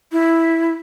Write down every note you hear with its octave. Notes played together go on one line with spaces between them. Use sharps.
E4